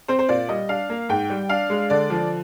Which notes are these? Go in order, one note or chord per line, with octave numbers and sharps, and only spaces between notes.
C4 C5
C5
A#2 D5
G3 D#5
D4 F5
A#3
G#2 G5
G3
D4 F5
G#3
D3 D5
F3